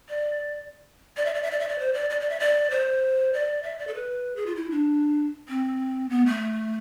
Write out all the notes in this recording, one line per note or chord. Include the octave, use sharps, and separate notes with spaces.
D5
D5
E5
D5
E5
D5
E5
D5
C5
D5
D5
D5
E5
D5
C5
D5
E5
D5
A4
B4
G#4
F4
E4
D4
C4
B3
A3